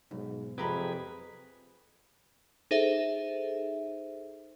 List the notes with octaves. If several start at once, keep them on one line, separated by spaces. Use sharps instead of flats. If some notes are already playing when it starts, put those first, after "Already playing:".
B1 G#2
F2 C3 G4 G#4 B4 A#5 B5
D#4 G#4 A4 C5 E5